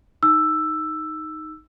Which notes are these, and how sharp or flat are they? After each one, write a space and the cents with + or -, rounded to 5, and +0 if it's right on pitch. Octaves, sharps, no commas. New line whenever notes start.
D#4 +0 E6 +5